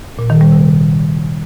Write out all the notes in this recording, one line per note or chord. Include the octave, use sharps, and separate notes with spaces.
A#2
D#3
G3
C3